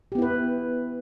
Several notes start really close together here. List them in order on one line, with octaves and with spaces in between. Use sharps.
G4 B3 E4 B4